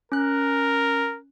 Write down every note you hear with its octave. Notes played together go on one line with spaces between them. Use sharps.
C#4 A#4 F#6